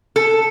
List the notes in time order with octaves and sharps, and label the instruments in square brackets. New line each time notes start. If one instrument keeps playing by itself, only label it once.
[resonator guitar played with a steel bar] A4